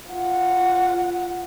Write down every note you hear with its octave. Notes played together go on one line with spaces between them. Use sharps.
F4 F#5